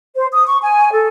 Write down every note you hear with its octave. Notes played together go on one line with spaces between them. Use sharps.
C5
D#6
C#6
G#5
A4